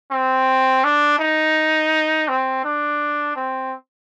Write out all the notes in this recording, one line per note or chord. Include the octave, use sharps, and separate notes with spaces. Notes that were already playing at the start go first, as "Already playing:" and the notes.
C4
D4
D#4
C4
D4
C4